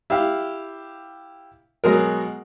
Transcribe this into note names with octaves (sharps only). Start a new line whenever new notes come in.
E4 G4 E5 F5
B2 F#3 G#3 F#4 G#4 A#4